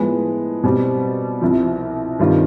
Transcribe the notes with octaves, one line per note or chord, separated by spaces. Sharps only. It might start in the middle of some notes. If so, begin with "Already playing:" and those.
Already playing: A2 F3 G#3 B3
B2 G3 C4
C2 C3 F3
G2 D#3 G3 C4 F4